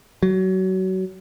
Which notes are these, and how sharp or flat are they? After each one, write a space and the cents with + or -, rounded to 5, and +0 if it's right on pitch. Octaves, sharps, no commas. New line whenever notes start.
F#3 +25